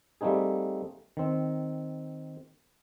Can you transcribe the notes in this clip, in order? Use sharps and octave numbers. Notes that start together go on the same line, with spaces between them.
G3 A3 A#3 C4 D#4 G#4
D#3 C4